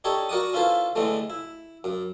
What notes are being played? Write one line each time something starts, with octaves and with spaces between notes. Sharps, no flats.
D4 D#4 G4 A4 C#5
F#4 A#4 D5 F#5 D#6
C#4 E4 F4 A4 B4 C5
A2 D3 E3 G#3 A3
E4
F#2